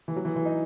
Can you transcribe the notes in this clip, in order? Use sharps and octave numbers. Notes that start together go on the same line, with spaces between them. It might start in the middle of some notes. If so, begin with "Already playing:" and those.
E3
F#3
E3
E3
D#4